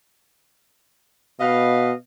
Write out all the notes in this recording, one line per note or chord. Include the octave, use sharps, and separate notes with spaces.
B2 B4 D#5 F5